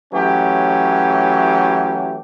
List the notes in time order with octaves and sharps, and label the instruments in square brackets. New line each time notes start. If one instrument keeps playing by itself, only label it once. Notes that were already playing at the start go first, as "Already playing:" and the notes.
[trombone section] E3 F#3 A3 C#4 G4